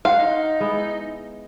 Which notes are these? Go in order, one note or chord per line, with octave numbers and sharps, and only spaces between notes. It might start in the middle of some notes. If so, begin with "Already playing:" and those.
F5 F#5 C6
D#4
G#3 B3 E4